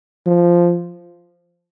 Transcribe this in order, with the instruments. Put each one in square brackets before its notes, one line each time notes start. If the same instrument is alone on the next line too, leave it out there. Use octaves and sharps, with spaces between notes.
[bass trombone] F3